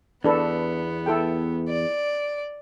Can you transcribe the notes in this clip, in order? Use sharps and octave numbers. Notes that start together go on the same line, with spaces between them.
E2 B3 D4 A4 B4
E4 A4 G5
D5